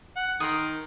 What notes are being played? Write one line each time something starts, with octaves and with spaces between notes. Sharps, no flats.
F#5
D#3 A#4 C6 D#6